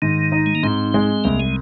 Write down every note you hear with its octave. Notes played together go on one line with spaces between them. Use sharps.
G#2 D#3
D#4
G#3
A#3
G#2 C4
G#3
C2 A#3
G#3